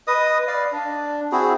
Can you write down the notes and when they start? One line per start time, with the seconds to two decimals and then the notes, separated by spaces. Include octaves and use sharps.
0.07 B4 D#5 D#6
0.48 D5 F5
0.73 D4
1.32 C4 E4 F#4 G#4